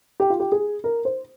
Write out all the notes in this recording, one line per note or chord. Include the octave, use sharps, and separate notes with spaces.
G4
F4
G4
G#4
A#4
C5